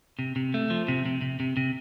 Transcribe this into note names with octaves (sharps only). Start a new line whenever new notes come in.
C3
C3
A3
F3
C3
C3
C3
C3
C3